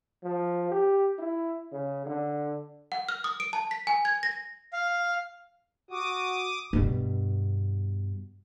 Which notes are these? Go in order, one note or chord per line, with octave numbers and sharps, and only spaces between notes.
F3
G4
E4
C#3
D3
F#5
F6
D#6
D7
A5
B6
G#5
G#6
A#6
F5
F#4 D6 D#6
G2 B2